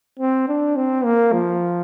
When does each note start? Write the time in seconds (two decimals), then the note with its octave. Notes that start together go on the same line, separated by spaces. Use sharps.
0.19 C4
0.48 D4
0.76 C4
1.04 A#3
1.32 F3